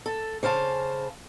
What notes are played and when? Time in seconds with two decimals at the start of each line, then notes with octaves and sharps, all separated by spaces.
0.06 A4
0.43 C#3 C5 F5 A5